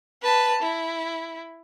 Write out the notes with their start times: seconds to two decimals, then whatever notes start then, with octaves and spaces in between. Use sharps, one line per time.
0.22 B4 A5
0.62 E4